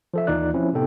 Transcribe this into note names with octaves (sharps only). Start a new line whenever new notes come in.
F3 A4 E5
D#2 E3 D#4 F4 D5 F#6
F3 C4 C#4 E4
A2 C3 B3 D#4 A4 G5